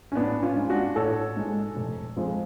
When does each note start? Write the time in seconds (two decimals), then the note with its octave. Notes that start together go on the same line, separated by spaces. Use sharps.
0.12 C#4
0.15 A1 B3 D4
0.43 C#4 F4
0.56 G#2 G#3
0.70 D4 F#4
0.96 A1 A4 C#5
1.37 G#2 G#3
1.77 F1
2.16 F2 F3 G#3